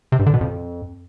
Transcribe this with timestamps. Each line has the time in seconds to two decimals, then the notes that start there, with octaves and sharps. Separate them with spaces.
0.12 C3
0.19 G2
0.26 D3
0.34 B2
0.41 F2